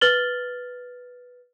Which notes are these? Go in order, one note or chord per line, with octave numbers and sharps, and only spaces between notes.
B4 F6 A6 F#7 G7